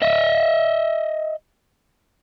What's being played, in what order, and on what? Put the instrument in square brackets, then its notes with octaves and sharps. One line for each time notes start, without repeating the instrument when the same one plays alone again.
[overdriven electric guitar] D#5 E5